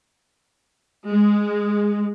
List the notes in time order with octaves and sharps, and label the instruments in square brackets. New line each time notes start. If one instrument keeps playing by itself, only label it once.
[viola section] G#3